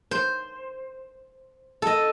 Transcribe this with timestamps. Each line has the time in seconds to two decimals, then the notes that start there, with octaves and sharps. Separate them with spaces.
0.11 C5
1.82 A4 D#5